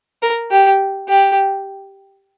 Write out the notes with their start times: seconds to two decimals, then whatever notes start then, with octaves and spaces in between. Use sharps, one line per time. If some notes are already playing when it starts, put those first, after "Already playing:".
0.23 A#4
0.51 G4
1.08 G4